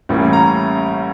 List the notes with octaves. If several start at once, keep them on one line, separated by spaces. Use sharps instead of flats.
A1 A2 G3 A#3 C#4
A#5